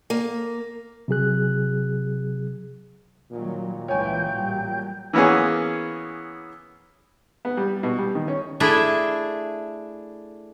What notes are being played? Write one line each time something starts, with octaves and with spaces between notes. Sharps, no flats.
A#3
C3 F#3 G#4 F#6
A#2 D#3 F#3 G3
C#2 E3 C#5 G5 G#5
A1 F#3 G3
E3 A#3 B3 C#4 G#4
B3
G3
B2
G3
D#3
C#4
A3 D4 E4 G#4